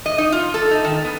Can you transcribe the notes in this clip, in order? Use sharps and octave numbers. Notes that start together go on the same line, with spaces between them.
D#5
D#4
F4
A4
D#4
D#3
B3